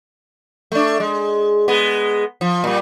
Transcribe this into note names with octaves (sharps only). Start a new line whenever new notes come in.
A3 D4
G#3
G#3 B3
F3
A#2 G3